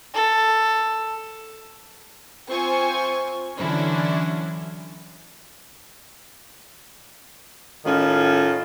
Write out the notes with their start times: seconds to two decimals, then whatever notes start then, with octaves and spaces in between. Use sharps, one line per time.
0.14 A4
2.47 C4 F4 C5 G#5 C#6
3.57 D3 E3 F#3 C#4 D4 E4
7.85 A2 D#3 C#4 F4